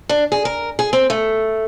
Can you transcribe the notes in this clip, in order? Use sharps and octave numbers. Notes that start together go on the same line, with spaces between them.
D4
G#4
A#4
G#4
C4
A3